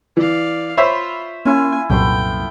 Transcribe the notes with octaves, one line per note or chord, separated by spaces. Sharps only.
E3 D5 F5
F4 C5 C#5 E5 B5 E6
A#3 C#4 E4 F4 G#5
C2 F#2 A#2 A3 B3 G5 C6